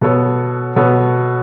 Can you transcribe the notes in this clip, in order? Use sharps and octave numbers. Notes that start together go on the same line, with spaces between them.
B2 B3 A4 C#5
B2 B3 A4 C#5